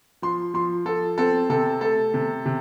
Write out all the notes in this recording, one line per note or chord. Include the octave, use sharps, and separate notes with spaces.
F3 C6
F3 C6
F3 A4
C4 A4
C3 A4
A3 A4
C3
C3